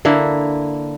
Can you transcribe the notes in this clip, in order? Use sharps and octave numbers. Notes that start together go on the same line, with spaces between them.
D3 A#3 E4